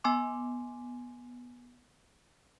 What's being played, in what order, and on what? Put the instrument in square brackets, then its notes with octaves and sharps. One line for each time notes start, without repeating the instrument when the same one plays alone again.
[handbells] B3 G#5 C6 D6